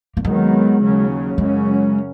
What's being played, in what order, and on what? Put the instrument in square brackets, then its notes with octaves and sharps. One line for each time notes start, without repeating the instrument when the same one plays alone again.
[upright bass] A#3
[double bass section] D#2 D#3 F#3 B3 [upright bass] G#3
[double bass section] D#2 C#3 F#3 C#4
[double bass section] F#2 C#3 F#3 C#4 [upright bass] G#3